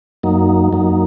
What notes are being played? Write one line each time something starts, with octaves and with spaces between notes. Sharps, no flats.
F#2 F#3 A#3 D#4
F#2 F#3 A#3 D#4